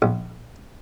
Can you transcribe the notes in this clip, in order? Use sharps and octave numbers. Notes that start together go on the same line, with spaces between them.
A#1